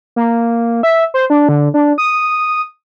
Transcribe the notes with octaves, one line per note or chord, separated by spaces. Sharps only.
A#3
E5
C5
D4
D3
D4
D#6